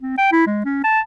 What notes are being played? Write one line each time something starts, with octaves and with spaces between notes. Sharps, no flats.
C4
G5
E4
G#3
C#4
A5